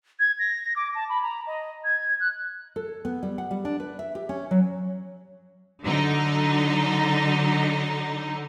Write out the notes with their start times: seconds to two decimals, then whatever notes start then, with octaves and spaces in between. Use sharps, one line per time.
0.19 G#6
0.39 A#6
0.76 D6
0.95 A5
1.09 B5
1.23 A#5
1.47 D#5
1.84 G#6
2.20 F#6
2.76 A4
3.05 B3
3.23 G3
3.38 F#5
3.51 G3
3.65 D4
3.80 B4
3.99 E5
4.15 G4
4.29 C#4
4.51 F#3
5.82 D3 F#3 D#4